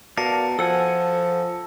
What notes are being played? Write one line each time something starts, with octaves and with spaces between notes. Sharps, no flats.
B2 A#4 D5 F5 A5 A#6 C#7
F3 A4 F#5 G#5 E6